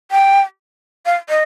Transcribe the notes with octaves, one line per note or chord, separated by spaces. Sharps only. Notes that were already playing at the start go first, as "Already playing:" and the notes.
G5
F5
D#5